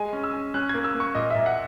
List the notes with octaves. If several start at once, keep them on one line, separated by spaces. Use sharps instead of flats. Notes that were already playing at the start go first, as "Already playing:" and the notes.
Already playing: G#3 G#5
C#4
E6
C#4
C#4 F#6
A#3 G#6
E6
A#3
C#6
A#2 D#5
A#2 E5
F#5